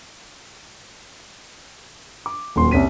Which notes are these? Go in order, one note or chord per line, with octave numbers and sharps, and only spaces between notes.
D6
D#1 F#3 C6
C2 C#4 B6 D#7